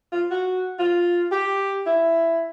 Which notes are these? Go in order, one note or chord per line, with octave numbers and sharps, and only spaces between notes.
F4
F#4
F4
G4
E4